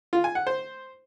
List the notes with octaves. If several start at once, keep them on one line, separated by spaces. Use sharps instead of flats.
F4
G#5
F#5
C5